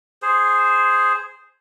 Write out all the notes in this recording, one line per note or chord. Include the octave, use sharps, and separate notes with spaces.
G#4 C5